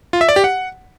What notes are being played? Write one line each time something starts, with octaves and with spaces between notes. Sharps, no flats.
F4
E5
D5
G4
F#5